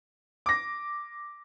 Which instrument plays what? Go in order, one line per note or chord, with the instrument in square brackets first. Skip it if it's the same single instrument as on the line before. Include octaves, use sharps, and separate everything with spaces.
[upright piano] D6 A#6